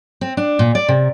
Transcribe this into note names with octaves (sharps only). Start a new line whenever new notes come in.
C4
D4
A#2
D5
C3